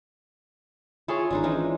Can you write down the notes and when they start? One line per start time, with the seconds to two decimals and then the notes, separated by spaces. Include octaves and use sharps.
1.08 E4 F4 G#4 A4 C#5 F5
1.30 G#1 G#3 D4 D#4
1.44 E3 F3 G#3 C#4